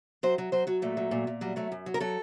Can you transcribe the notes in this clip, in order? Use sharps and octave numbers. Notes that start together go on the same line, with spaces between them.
F#3 C5
F#3
F#3 C5
F#3 F#4
A#2 A3
F#3
A#2
A#2
F#3 G3
F#3 A3
F#2
F#3
A#4
F#3 A4